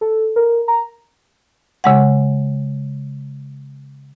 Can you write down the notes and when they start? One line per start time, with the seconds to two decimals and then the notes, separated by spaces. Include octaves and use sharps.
0.01 A4
0.36 A#4
0.68 A#5
1.84 C#3 G#3 F#5